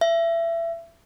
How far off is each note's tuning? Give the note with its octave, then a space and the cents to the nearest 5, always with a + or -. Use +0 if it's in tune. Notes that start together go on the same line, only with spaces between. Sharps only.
E5 +25